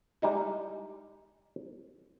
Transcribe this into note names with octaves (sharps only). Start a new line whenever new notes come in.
G3 G#3 D#4 E4